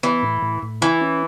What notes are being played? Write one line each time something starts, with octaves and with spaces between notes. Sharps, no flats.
E3 B3
A2
A2
A2
E3 E4
C#4